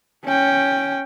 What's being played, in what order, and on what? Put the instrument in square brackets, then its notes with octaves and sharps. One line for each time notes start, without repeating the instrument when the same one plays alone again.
[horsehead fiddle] C#4 G5